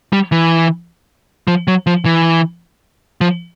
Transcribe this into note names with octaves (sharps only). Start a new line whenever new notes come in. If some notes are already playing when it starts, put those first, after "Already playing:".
G3
E3
F3
F#3
F3
E3
F3